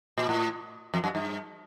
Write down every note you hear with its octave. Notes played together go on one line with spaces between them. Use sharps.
A#2
A2
F2
F#2
G2